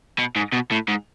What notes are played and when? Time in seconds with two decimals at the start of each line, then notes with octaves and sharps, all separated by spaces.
0.18 B2
0.36 G#2
0.53 B2
0.72 A2
0.88 G#2